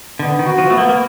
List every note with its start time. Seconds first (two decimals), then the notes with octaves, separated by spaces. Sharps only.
0.19 D3 B3
0.39 D#3
0.45 F#4
0.58 F3
0.70 A3 B3
0.78 A#3
0.89 A#3